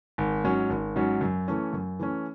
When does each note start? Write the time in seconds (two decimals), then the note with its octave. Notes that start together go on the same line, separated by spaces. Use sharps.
0.18 G#1
0.44 G#2 F#3 C#4
0.70 G#1
0.96 G#2 F#3 C#4
1.21 F#2
1.48 E3 A3 C#4
1.73 F#2
1.99 E3 A3 C#4